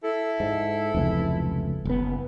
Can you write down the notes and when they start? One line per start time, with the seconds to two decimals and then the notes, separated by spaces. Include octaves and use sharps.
0.05 E4 A4
0.40 G#2
0.95 F1 C#2 E3
1.85 F#1 B3